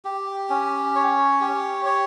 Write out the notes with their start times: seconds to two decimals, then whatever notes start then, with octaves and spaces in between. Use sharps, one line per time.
0.05 G4
0.50 C#4
0.95 C#5
1.41 G4
1.86 C#5